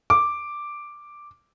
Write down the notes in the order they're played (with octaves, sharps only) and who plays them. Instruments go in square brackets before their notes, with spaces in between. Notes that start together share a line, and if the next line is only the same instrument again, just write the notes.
[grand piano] D6